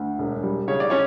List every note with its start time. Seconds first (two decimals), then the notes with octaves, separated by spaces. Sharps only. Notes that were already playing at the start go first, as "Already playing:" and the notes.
Already playing: D2
0.19 E1
0.43 G3
0.68 C#3 C#5
0.80 D5
0.90 C#4 C#5